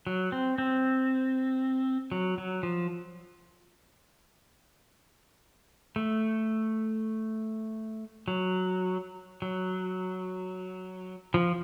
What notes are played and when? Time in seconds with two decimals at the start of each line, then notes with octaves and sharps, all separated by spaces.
0.07 F#3
0.32 C4
0.58 C4
2.12 F#3
2.38 F#3
2.63 F3
5.96 A3
8.28 F#3
9.42 F#3
11.34 F3